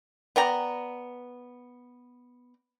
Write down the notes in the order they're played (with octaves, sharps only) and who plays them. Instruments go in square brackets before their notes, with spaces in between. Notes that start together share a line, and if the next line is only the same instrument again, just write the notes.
[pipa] B3 D5 G5 A#5